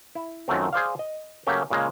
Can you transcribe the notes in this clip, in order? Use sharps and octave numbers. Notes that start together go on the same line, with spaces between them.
E4
F#2 D#3 F3 F#3 A3 C4
G#4 C5 D5 F5
D#5
C#3 F#3 A3 A#3 C#4 G4
A#2 C#3 G#3 A#3